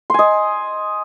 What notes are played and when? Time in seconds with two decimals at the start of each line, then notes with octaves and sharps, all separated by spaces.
0.10 C6
0.14 G#5
0.19 D#5